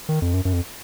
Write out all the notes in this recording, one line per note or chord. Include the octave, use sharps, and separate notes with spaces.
D#3
F2
F#2
F#2
F2